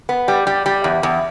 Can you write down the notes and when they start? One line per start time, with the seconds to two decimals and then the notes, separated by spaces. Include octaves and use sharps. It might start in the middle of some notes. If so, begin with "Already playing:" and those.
0.09 B3
0.28 G3
0.47 G3
0.66 G3
0.84 E2
1.03 E2